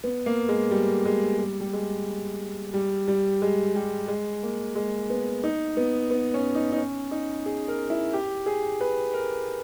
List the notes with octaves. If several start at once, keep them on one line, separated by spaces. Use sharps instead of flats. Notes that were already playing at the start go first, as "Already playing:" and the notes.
B3
A#3
G#3
G3
G#3
G3
G3
G#3
G3
G3
G#3
G3
G#3
A#3
G#3
B3
D#4
B3
B3
C#4
D#4
D#4
C#4
D#4
G#4
A#4
E4
G4
G#4
B4
A#4